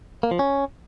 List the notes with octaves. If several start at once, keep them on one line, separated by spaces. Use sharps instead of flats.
A#3
F3
C#4